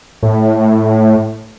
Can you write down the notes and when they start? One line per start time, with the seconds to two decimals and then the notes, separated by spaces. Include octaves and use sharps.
0.23 A2